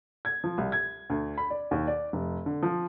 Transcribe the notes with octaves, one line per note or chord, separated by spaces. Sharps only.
G#6
F3
C2
G#6
D2
B5
D5
D#2
D5
F1
D3
F3